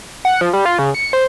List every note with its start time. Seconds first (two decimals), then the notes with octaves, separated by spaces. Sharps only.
0.25 F#5
0.41 F3
0.53 G3
0.66 F4
0.79 C#3
0.95 C#7
1.13 C5